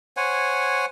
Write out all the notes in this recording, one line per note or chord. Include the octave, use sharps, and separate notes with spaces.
C5 C#5 F#5 G#5